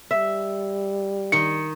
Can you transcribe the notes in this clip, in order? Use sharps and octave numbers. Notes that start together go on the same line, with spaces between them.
G3 E5
D#3 C#7